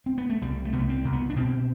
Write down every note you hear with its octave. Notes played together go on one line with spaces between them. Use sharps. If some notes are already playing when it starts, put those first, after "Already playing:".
C4
B3
A3
C2 G3
A3
C2 B3
A3
C4
C2
B3
D4
B2 C4